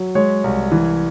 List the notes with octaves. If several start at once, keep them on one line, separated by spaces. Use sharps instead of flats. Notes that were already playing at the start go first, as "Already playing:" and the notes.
Already playing: F#3
G#3 C#5
C2
E3